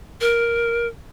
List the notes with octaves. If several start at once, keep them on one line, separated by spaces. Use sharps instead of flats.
A#4